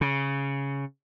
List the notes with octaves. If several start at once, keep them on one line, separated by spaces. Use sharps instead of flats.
C#3